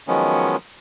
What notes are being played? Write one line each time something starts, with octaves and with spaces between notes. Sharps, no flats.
D#3 F3 F#3 G#3 B3 C#4